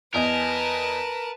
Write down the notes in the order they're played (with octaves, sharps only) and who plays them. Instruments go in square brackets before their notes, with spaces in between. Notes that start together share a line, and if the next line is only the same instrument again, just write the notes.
[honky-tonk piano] E2 D#5 G#5 [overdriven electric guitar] A#4 [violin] B4 A5